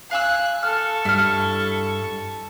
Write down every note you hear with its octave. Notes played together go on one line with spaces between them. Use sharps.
F5 G#5 E6 F#6
A4 C#6 F6
G2 E4 F6